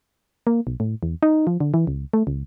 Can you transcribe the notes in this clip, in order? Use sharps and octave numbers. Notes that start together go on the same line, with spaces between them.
A#3
B1
A2
E2
D#4
F3
D3
E3
C#2
A3
C#2